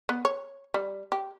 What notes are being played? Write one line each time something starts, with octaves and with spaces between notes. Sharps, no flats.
B3
C#5
G3
G4